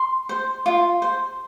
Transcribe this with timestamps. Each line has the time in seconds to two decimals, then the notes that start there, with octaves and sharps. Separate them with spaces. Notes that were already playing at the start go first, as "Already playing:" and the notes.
Already playing: C6
0.29 C5
0.66 F4
1.02 C5